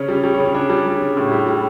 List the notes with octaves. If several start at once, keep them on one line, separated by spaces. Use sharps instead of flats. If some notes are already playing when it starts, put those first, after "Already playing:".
Already playing: C#3 C#4
G3
C#4
G3
C#4
C#3
C#4
C#3 D4
G3
G3
C#3
A2
G3
G3